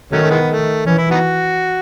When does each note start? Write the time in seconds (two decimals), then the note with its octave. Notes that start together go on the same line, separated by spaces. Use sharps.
0.12 D#3 F#3 A3 C#4
0.23 A3
0.30 E3 G#3 B3
0.49 A3
0.86 E3 C#4
0.98 E4
1.11 B3 D#4 F#4